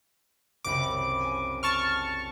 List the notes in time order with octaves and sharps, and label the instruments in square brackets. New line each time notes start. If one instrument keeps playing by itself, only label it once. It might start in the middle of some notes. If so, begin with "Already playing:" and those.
[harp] F#1 C2 B5 [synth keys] D6
[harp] G#5
[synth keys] A5 C#6 F6